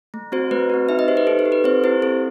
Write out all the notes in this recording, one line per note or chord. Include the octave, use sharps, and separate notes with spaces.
A3
C4 F#4 C5
A3 B4
C4 F#4
D#4 E5
D#5
G4 C5
B4
D#4 A4
A4
G4
B4
C4 C5
E4 G4 C5
C4 A4